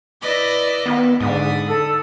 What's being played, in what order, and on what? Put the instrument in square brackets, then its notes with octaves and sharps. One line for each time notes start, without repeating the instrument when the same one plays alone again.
[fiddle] E4 B4 [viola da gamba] D5 D#5
[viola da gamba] D#3 [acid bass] B3
[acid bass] G#2 [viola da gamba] D3 [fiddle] B5 D#6
[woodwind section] A4